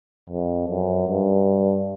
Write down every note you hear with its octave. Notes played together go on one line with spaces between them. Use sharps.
F2
F#2
G2